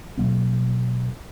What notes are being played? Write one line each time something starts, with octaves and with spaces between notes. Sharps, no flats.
B2 F#3 A#3 C4